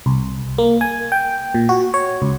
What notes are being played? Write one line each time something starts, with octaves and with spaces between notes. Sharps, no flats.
C2
A#3
G#5
G5
A#2
F#4
C#5
C#2